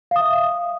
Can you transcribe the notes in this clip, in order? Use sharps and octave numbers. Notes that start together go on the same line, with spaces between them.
E5 F5 D#6